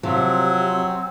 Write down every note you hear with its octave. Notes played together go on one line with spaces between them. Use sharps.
C3 F3 F#3 C4 F4